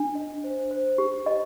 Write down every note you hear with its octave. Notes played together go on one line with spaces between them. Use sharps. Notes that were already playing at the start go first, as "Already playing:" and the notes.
Already playing: D4
D#5
C5
C5
G4
D#5